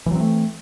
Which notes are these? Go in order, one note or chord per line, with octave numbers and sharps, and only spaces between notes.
E3 F#3 A3 C4